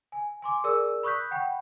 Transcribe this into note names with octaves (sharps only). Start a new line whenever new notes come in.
G#5
G#5 C6 D6
G#4 A#4 D5 E6
B5 C#6 D#6 F#6 G6 B6
F#5 G5 B5